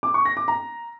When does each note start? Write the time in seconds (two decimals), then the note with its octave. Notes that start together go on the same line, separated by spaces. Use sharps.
0.03 D6
0.14 C#6
0.25 A#6
0.37 D6
0.48 A#5